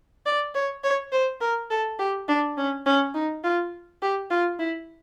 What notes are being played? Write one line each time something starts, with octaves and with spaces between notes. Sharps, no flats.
D5
C#5
C#5
C5
A#4
A4
G4
D4
C#4
C#4
D#4
F4
G4
F4
E4